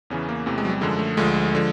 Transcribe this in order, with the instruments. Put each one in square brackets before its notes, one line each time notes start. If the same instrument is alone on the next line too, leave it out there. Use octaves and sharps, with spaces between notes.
[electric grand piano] E2 C#3 E3 C#4
A#3
E2 C3 E3 A3
G#3
F#3
G3
F#2 D3 F3 G#3
A3
D2 D3 F3 G#3
D3 F3